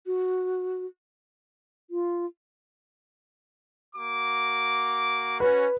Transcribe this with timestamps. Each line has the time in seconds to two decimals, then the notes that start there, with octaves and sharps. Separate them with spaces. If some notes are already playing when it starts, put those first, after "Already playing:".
0.06 F#4
1.90 F4
3.96 A#3 F#4 D6
5.40 C#4 F#4 B4